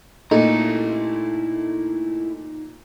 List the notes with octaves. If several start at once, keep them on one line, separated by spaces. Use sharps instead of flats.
A#2 A3 D#4 E4 A#5